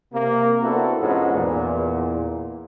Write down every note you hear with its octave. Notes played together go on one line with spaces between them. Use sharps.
C3 A#3
B3 C4 D4 E4 F#4 A4
F2 G#2 F3 G#3 B3 C#4
E2 A#2